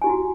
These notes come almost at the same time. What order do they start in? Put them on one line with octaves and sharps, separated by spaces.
G#5 G4 E4 F#4